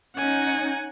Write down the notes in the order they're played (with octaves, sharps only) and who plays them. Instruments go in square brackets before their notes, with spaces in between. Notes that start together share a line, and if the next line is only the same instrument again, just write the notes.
[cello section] C#4 D#4 [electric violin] F#5 G#5